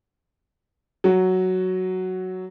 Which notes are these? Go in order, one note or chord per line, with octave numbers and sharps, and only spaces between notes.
F#3 F#4